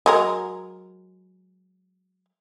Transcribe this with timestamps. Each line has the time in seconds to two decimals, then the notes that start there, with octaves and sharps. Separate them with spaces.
0.06 F#3 G#3 A#4